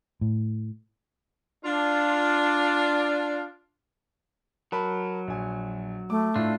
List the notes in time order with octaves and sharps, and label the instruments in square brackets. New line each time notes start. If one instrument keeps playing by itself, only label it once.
[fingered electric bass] A2
[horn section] D4 F4
[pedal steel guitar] F#3 [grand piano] A#4 A5 B5
[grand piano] A#1 G#5
[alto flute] A3 [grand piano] D6
[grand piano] A2 [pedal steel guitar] D4 F4